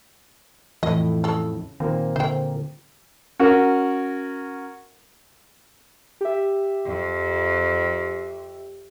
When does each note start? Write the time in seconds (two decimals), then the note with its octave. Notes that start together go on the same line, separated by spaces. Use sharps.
0.83 F2 A2 E3 E4 D#5
1.24 C#3 A4
1.80 A#2 D#3 A#3 C4
2.16 D3 C5 G5
3.39 C#4 F#4 A#4
6.21 G4 E5
6.85 F2